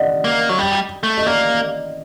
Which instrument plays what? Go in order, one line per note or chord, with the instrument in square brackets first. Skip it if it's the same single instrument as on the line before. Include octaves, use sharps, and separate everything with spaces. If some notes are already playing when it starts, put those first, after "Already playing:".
Already playing: [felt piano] D5 D#5 F#5
[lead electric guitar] A#3
F#3
G3
A3
[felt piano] D#5
[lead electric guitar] A#3 [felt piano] D5